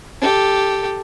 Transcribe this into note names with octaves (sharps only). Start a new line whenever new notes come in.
G4 A4